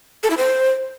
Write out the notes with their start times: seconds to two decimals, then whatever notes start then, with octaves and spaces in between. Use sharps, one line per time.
0.23 A4
0.30 E4
0.37 C5